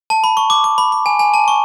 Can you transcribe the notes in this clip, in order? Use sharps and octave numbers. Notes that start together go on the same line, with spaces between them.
A5
B5
C#6
D6
D6
B5
B5
G#5
G#5
A5
C#6